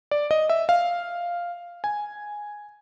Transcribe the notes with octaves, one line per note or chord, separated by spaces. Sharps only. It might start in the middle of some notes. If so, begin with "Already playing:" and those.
D5
D#5
E5
F5
G#5